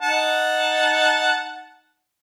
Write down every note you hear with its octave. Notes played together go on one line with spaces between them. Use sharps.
D#4 F#5 A5